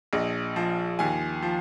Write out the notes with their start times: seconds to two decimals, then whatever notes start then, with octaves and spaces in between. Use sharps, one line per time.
0.13 A#1 D#5
0.56 F3
0.99 D#2 G#5
1.42 F3